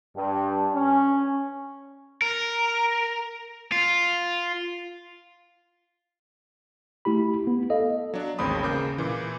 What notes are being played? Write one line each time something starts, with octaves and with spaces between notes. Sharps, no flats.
G2
C#4
A#4
F4
A3 E4 G4 B5
B3
A4 D#5 F5
F#3 D4
A1 D#2 G#3 C4 B5 D#6
C#3 A#3 D6 G6
A#2 E3